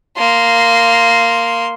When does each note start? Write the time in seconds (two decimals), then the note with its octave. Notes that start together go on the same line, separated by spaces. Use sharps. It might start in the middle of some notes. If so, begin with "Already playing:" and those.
0.17 A#3 C6